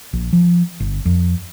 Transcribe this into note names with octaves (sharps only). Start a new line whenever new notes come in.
A#1
F3
G1
F2